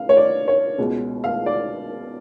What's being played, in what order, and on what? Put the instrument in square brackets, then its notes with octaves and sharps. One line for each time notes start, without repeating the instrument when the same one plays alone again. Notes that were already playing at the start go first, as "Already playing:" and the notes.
Already playing: [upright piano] C#3 F5
C#5
D5
C#5
C#2 B2 G#3
F5
D5